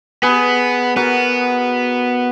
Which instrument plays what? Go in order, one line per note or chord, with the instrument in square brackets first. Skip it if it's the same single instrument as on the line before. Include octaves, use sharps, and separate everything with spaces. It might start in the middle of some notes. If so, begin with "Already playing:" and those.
[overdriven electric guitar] B3 [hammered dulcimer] G#4 B4
[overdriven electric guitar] B3 [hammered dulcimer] F#4 A#4